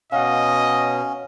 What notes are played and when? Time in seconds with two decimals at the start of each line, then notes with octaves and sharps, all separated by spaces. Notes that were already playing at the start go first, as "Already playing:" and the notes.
0.12 B2 C#4 D#5 F5 F#5